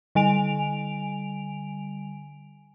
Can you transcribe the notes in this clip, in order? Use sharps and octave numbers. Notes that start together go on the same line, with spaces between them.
D3 G3 G#5 D7 F7